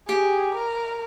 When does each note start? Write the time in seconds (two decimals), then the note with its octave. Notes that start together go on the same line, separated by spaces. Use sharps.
0.09 G4 G#4
0.55 A#4